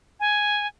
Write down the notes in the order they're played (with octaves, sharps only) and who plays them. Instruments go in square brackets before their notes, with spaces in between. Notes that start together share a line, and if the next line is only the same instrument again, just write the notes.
[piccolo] G#5